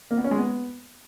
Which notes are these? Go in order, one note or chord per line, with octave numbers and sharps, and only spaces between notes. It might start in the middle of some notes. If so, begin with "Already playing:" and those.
A#3
B3
C#4
G#3
B3